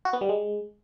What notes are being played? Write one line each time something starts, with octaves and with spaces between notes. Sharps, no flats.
F#4
B3
G3
G#3